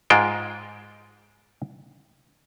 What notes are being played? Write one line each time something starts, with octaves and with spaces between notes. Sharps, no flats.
G#2 G#3 F4 G5